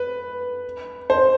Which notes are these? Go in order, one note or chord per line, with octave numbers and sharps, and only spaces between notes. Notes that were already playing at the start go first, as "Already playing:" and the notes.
Already playing: B4
C5